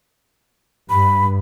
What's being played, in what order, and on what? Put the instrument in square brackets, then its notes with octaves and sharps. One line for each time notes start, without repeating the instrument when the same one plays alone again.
[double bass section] G2 [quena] B5